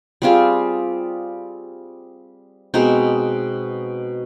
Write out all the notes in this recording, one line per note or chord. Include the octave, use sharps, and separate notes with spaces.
G3 C4 F4 G#4
B2 G#3 C4 D#4